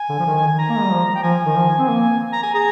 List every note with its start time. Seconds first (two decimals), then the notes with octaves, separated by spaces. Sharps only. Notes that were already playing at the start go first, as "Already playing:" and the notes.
Already playing: G#5
0.10 D3
0.19 F3
0.26 D#3
0.48 G#5
0.59 A#5
0.69 A#3
0.77 G#3
0.84 G3
0.91 F3
1.16 G5
1.23 F3 G#5
1.45 D#3
1.56 F3
1.79 C4
1.89 A#3 G#5
2.33 A#5
2.43 G#5
2.54 G#4 A#5